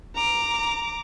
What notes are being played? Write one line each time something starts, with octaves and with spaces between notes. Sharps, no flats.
A#5 D6